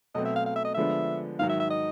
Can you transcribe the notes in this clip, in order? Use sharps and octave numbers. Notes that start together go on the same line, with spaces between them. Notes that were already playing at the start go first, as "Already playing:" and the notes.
B2 F#3 A3 C4 D#5
E5
F5
F5
E5
D#5
D3 F3 G#3 B3 D4 E5
G#2 D#3 F#3 F5
E5
E5
D#5